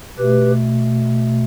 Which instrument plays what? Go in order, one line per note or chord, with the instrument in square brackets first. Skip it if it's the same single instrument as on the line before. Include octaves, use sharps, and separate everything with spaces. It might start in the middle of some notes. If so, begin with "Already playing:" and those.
[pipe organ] B2 A3 G4 B4